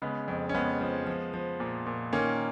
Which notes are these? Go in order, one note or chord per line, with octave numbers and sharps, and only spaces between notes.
C#3 G#3 B3
F2
C#4
F2 G#3 B3
F3
F3
F3
A#2
A#2
D#3 A#3 C#4